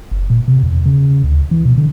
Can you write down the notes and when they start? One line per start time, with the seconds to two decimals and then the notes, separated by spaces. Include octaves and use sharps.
0.11 F#1
0.30 A#2
0.48 C3
0.63 E2
0.86 C#3
1.24 D2
1.51 E3
1.65 B2
1.78 D3